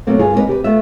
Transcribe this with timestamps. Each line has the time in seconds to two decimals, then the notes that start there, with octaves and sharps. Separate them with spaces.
0.07 B2 F#3 A3 A#3 C4
0.19 G2 F4 G#4
0.34 G#3 A#3 C4 C#4 D#4 B4
0.47 C3 G4 A#4 B4
0.64 A3 B3 F4 E5